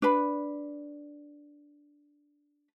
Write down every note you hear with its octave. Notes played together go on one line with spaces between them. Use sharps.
D4 B4 B5